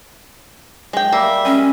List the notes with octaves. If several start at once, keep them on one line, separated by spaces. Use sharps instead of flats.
G#3 G5
G3 A#3 E5
G#3 C#4